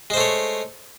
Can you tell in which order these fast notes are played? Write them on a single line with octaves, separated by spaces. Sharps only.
G#3 C5 A3 C#5